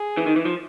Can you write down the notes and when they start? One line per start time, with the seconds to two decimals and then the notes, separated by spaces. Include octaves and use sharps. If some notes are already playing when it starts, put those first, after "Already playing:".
Already playing: G#4
0.17 E3
0.26 D#3
0.36 E3
0.45 F3